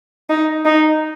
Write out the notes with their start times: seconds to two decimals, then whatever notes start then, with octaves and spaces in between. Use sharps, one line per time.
0.30 D#4
0.65 D#4